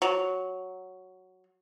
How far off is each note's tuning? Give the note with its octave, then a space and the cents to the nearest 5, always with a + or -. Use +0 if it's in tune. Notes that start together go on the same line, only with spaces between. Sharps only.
F#3 +0